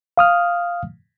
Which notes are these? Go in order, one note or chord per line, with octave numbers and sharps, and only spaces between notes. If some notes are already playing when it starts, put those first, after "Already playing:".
F5 D#6 F6